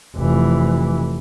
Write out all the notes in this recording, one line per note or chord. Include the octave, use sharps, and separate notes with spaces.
F1 E3